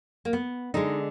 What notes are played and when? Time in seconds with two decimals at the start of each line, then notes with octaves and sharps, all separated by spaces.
0.25 A#3
0.33 B3
0.74 D3 G#3 D#4